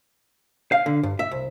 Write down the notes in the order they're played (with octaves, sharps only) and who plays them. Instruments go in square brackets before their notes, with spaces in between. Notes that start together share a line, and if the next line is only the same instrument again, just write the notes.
[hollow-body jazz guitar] F5
D3
G2
E5
C2